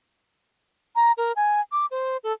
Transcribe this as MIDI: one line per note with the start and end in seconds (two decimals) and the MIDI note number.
0.96 1.12 82
1.17 1.32 70
1.36 1.61 80
1.72 1.86 86
1.91 2.17 72
2.24 2.33 69